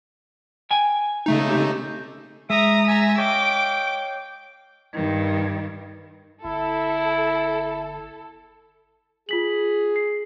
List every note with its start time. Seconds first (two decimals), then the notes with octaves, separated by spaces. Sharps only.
0.71 G5 G#5
1.26 C#3 A3 D#4
1.47 C4 G4
2.50 G#3 E5 A#5 D#6
2.88 E5 G#5 A#5
3.18 C#5 D#5 F5 G5 D6
4.93 G2 D#3
6.45 G1 E4 A4
9.29 F4 G#4 B6 F#7
9.96 C7